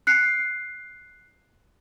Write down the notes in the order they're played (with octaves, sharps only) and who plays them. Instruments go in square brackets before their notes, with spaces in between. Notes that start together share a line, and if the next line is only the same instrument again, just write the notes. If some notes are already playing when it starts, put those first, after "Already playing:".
[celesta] F#6 C7 C#7